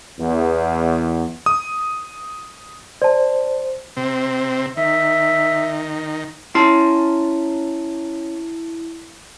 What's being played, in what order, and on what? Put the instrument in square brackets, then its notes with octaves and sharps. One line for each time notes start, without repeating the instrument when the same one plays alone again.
[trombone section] E2
[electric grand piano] D#6
[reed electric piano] C5 [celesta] D5 A5
[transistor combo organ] C3 C4
[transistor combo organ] D#3 [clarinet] E5
[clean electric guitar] C#4 C6 [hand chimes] E4 A5